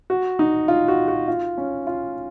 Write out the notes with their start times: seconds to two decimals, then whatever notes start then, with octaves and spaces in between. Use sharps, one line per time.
0.10 F#4
0.39 D#4
0.68 F4
0.88 F#4
1.08 F#4
1.28 F4
1.58 C#4
1.87 F4